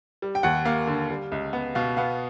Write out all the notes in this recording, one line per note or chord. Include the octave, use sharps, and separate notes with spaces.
G3
G5
D#2 F#5
A#3 F5
D3
G3
C#2
B3
B2 F5
B3 F5